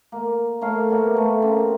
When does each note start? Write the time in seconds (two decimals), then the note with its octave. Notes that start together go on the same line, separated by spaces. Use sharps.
0.12 A#3
0.61 A3 A#3 C#5 F5
0.89 A#3 B3 C#5 E5
1.16 A3
1.42 C#3 A#3 C4